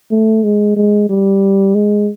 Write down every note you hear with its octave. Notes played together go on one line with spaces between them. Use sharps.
A3
G#3
G#3
G3
G#3